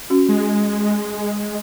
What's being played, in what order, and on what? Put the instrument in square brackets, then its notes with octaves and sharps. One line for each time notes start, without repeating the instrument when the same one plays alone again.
[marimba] C#4 F#4
[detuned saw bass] G#3